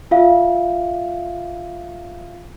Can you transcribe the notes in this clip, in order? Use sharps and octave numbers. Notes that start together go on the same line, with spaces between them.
F4 E5 F5